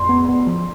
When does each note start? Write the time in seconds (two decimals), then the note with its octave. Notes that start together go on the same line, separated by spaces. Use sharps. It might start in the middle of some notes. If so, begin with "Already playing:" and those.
Already playing: F2 C6
0.09 B3
0.28 B3
0.47 F3